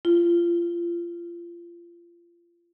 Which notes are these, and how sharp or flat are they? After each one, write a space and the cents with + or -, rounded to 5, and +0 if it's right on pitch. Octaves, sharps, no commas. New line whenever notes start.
F4 -25